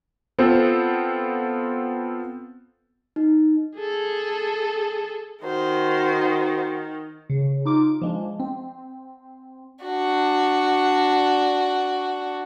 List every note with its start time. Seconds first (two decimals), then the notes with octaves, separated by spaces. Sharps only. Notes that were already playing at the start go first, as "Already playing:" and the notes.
0.38 B3 C4 F4 A4 C5
3.16 D#4
3.79 G#4 A4
5.45 D#3 F#4 C5
7.30 C#3
7.65 D#4 F4 D6
8.01 F3 G#3 D4
8.40 C4
9.84 D4 F#4